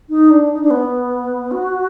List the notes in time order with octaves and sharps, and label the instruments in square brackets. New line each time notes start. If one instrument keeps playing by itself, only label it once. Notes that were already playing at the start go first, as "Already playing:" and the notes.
[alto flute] D#4
D4
D#4
D4
B3
F#4